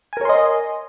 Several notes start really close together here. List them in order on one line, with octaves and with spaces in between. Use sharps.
G#5 A#4 C#5 C6 D#5